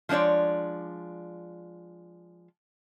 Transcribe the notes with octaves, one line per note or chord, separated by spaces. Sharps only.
F3 G#3 D4 C#5 D5